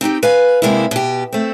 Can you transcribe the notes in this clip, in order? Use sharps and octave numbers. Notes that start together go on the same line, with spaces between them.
C4 D#4 F#4 G4
B4 F5 G#5
C3 G#3 A#3 D4 E4
B2 G4
A3 C4